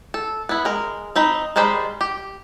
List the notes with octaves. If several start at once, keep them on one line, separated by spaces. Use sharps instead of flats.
A4
B3 E4
G#3 A#4
C4 D#4 B5
D#3 G3 G#3 C5 B5
G4